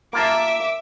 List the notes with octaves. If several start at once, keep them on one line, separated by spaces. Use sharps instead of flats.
A#3 F4 E5 A5 D6